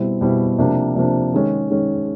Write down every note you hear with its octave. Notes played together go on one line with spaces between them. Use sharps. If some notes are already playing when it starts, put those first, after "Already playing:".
Already playing: B2 G3 C4 E4
B2 G3 C4 E4
C3 F3 A#3 D4
C3 F3 A#3 D4
D#3 G#3 C#4
D#3 G#3 C#4